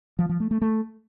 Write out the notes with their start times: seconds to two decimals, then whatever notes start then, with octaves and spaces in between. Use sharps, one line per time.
0.19 F3
0.29 F3
0.40 A3
0.51 A3
0.62 A3